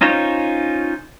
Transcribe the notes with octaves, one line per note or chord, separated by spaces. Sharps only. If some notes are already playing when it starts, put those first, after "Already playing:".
C#4 D#4 F4 C5 C#5